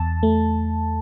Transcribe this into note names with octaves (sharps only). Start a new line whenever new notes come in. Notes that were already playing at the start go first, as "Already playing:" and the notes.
Already playing: E2 A5
A3